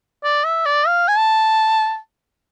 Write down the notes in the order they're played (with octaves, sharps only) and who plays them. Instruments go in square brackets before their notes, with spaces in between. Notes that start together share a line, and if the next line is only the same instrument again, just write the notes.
[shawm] D5
E5
D5
F5
G#5
A5